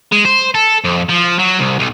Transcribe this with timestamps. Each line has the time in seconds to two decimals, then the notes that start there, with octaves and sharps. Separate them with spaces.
0.12 G#3
0.25 C5
0.55 A4
0.85 F2
1.09 F3
1.39 F#3
1.59 C2
1.79 B1